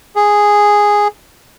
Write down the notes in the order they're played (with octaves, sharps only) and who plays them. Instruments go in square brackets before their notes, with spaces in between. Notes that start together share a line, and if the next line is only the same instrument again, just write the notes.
[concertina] G#4